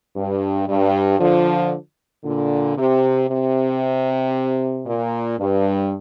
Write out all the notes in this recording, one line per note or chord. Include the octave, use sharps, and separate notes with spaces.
G2
G2
D3 F3
A#2 D3
C3
C3
A#2
G2